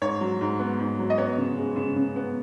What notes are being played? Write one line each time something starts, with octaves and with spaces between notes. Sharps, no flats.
G#2 C#5
F#3
G#2
B3
G#2
F#3
D#5
B3 C#5
C#3
G#3
C#3
C#3
B3